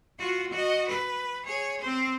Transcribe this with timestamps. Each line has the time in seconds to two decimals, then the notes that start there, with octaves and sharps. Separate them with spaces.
0.19 F4 F#4
0.51 F#4 D#5
0.89 B4
1.45 G#4 C#5
1.81 C4 C5